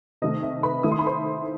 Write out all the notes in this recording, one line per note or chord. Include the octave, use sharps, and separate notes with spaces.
C3 D#3 A3 D#5
E5
B4 B5
D#3 A3 E4 D#6
C6
B5
C5 C6